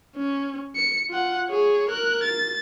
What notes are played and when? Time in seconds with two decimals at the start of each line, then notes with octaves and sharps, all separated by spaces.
0.16 C#4
0.76 C#7
1.09 F4 F#5
1.50 G#4 C#5
1.89 A#4 F#6
2.24 A6